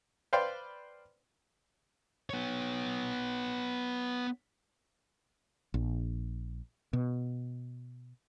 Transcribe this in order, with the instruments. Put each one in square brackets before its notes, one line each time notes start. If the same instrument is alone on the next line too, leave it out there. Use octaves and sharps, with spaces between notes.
[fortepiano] B4 C5 D5 F5 G5 C6
[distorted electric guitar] B3 C#5
[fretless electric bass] A#1
B2